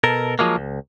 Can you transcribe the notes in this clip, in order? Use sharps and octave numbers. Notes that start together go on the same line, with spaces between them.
B2 A4 A#4
F3 F#3 G#3 A#3
C#2